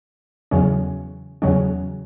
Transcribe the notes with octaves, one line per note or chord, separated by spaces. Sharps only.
E2 C#3 F#3 C#4
E2 C#3 F#3 C#4